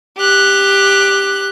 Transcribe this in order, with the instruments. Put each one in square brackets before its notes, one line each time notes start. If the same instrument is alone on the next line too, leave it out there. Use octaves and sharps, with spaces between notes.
[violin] G4 F#6